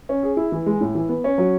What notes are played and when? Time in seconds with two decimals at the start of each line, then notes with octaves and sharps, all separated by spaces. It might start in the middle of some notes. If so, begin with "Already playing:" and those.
0.09 C#4
0.23 G#4
0.37 E4
0.52 E3
0.66 G#3
0.81 A2
0.95 E3
1.09 B3
1.24 C#4
1.38 F#3